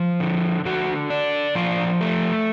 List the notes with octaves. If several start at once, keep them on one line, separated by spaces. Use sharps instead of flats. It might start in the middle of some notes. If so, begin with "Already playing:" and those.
Already playing: F3
D3
D3 F#4
D4
F3 F4
A3